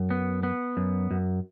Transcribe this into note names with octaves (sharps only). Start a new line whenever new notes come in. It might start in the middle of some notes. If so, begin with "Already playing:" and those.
Already playing: F#2
B3
B3
F#2
F#2